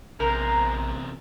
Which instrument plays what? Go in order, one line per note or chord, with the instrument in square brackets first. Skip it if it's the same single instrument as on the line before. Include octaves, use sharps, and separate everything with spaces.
[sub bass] A#1 [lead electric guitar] E2 C3 [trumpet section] G#3 C5 A#5 [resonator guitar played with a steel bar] A#4